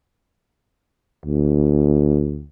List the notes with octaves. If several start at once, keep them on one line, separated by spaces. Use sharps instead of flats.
D2